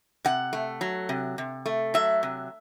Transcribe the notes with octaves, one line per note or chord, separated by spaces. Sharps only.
C3 F#5
A3
F#3
C3
C3
A3
F#3 E5
C3